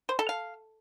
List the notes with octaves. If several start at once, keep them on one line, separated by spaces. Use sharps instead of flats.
C5
A4
F5